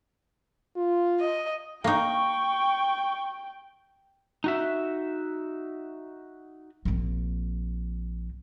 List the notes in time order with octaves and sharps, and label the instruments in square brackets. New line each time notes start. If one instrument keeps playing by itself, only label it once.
[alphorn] F4
[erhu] D#5
[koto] A#3 D#4 [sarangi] G5 [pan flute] C#6
[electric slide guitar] D#4 F#4 E5
[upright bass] A#1 C4